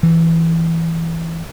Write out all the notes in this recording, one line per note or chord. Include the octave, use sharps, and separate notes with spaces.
E3